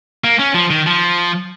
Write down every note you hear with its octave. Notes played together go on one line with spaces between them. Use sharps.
A#3
C#4
F3
D#3
F3